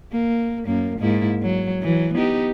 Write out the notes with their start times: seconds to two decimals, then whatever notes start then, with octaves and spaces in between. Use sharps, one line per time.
0.12 A#3
0.66 F#2 A#3
0.99 G#2 A#3 E4
1.42 F#3
1.82 E3 F#3
2.14 B3 D#4 G4